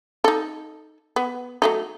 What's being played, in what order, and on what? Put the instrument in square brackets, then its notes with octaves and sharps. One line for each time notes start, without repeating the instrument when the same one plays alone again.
[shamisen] D#4 A4
B3
F#3 A3 D#4